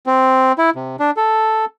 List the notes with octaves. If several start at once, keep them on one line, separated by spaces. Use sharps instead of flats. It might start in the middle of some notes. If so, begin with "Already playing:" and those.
C4
E4
C3
D4
A4